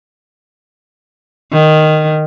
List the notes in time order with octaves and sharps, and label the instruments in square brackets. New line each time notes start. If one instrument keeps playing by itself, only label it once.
[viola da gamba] D#3